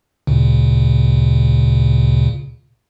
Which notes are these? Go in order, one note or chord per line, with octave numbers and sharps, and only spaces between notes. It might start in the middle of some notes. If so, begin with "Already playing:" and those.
D2 A#2 C#3